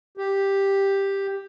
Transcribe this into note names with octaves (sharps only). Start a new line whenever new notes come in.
G4